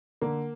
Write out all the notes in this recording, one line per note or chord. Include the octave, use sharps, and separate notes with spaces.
D3 A#3